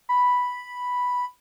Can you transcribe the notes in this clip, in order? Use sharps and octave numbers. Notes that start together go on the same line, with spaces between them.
B5